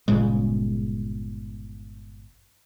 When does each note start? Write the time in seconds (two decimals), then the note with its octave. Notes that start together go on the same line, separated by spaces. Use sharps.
0.08 G1 A#2 C#3 G#3